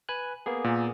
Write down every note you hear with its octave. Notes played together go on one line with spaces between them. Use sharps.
B4 G#5 F#6
A#3 B3 G#4
A#2